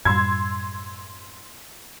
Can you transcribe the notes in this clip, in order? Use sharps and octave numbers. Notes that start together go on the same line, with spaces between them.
F#2 A2 G3 C6 E6 G#6